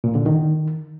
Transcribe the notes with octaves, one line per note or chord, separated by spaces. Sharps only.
A#2
D3
D#3